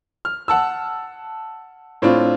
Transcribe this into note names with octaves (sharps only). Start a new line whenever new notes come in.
F6
F#5 A5 E6
A2 C4 D4 F4